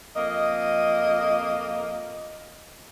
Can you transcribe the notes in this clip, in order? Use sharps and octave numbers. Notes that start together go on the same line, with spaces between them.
F2 A#3 D#5